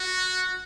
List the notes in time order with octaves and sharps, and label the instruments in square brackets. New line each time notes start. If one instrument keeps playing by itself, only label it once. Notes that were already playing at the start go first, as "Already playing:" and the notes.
Already playing: [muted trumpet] F#4